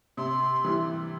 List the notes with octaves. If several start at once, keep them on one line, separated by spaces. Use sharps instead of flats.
C3 C6
E3 G3